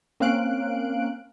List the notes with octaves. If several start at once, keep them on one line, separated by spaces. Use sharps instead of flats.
A#3 C4 C#4 F5 F#6 D7